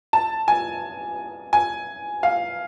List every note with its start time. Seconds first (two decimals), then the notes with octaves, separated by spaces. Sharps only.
0.13 A5
0.48 G#5
1.53 G#5
2.23 F5